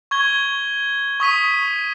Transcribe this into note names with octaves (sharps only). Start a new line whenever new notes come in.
C#6 G#6 G7
C#6 D#6 B6 D#7